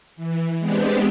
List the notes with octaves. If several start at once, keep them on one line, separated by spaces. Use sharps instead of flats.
E3
G#3 B3 C4 D4 G4